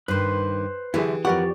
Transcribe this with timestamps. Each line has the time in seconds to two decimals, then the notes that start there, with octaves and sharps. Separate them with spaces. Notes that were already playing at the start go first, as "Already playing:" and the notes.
0.08 G2 D#3 B4 C5
0.94 F#2 D3 E3 E4 G4 G#4
1.25 F2 G4 A#4 B4 D5 F#5 C#6